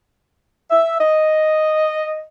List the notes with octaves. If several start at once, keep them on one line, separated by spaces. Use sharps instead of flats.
E5
D#5